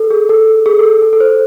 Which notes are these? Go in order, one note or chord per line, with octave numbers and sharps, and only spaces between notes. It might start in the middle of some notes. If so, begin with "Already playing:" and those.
Already playing: A4
G#4
A4
A4
G#4
A4
G#4
A4
A4
C5